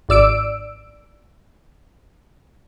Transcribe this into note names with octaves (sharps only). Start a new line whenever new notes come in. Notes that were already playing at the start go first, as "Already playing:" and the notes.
G#1 D5 E6 D7